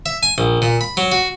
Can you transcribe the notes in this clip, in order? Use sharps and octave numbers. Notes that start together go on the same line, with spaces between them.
E5
G#5
A#1
A#2
B5
F#3
F#4